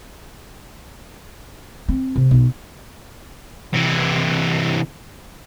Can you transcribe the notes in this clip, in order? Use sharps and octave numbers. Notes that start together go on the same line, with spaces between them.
C4
C3
B1
C3 E3